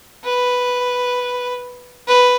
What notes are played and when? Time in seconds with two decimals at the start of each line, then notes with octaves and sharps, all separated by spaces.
0.24 B4
2.08 B4